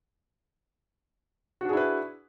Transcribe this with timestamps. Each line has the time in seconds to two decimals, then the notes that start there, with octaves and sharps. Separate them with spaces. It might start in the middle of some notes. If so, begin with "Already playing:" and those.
1.61 F#4
1.65 D4
1.69 G#4
1.73 E4
1.77 B4